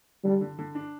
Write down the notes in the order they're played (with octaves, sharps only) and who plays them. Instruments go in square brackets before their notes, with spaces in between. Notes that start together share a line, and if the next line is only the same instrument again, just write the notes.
[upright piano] D3 [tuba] G3
[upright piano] D3
D3
D4